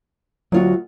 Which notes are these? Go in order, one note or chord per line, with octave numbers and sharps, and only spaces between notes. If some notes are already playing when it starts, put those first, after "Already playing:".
D2 F#3 F4 F#4